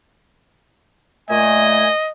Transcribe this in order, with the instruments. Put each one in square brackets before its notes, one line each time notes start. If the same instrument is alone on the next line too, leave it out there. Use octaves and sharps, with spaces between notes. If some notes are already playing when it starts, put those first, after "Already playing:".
[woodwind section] A#2 A3 G#5 [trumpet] D#5